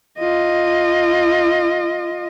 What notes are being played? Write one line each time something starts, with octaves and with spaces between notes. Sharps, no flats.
F4 D#5